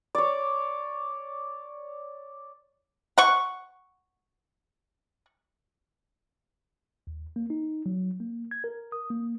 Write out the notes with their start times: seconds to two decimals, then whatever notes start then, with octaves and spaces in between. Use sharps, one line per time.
0.15 C#5 D5
3.18 F#5 C#6
7.07 D#2
7.36 A#3
7.50 D#4
7.86 F#3
8.20 A#3
8.51 G#6
8.64 A#4
8.92 D#6
9.10 A#3